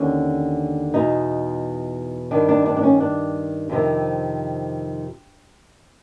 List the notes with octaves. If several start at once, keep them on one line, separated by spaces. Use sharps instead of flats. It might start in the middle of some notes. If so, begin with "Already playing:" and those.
Already playing: D#2 D3 C#4
E2 B2 D#4
G2 D#3 D4
D4
D4
D4
C#4
D4
F2 C3 D#3